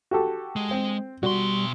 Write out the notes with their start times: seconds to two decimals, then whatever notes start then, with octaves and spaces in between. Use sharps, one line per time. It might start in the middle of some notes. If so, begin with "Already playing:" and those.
0.11 F#4 G4 A4
0.56 G#3
0.71 C4
1.23 B2 G3 F#4 C6